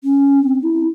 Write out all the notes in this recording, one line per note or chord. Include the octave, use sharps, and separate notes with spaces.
C#4
C4
E4